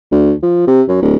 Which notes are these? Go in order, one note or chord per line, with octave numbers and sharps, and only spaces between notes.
D2
F3
C3
F#2
D1